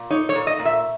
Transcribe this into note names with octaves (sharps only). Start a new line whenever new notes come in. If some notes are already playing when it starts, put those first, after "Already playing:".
Already playing: A#2
D#4 C#5
C#5
A#2
D#5
A#2
E5